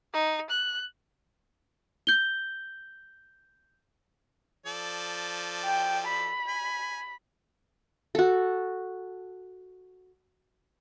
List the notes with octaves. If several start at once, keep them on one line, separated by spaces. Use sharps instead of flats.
D#4
F#6
G6 G7
F3 A4 D5
G5
B5
G#5
F#4 A4